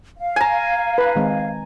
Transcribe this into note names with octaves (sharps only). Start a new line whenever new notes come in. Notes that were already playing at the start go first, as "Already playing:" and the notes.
F5
G#5 A#5
B4
D#3 G#3 C4